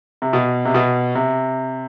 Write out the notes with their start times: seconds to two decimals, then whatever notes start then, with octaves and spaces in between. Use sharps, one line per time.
0.22 C3
0.33 B2
0.65 C3
0.74 B2
1.15 C3